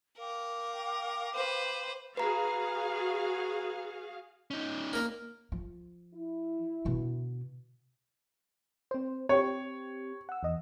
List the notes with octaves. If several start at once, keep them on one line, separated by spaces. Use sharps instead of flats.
A#4 F5 G5 D6
B4 C5
F#4 G#4 B4 F5 A#5
C#4 D#4
A#3 A#4
F3
E4
B2 D3
C4 C5
C4 G4 C#5
F#5 E6
E2 D#5